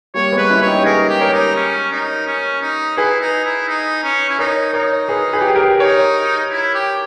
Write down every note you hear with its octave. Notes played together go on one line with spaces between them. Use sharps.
G3 A#3 C#5
G#3 B3
B4
C#4 E4
C#5
D#4 G4
G#4 A#4 B4
G4
A#4 C#5
D#4
C#4
D#4
C#4
D#4
E4 G#4 B4
D#4
E4
D#4
C#4
E4
D#4 A#4 C#5
D#4 A#4 C#5
G#4 B4
G#4 B4
G4
G#4
G4 A#4
D#4 A#4 C#5
E4
G4